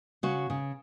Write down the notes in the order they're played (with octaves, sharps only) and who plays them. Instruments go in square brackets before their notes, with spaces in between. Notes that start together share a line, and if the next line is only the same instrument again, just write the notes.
[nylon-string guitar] C#3 F#4
C#3